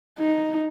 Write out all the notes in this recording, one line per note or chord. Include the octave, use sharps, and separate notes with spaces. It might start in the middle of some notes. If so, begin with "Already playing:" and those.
D#4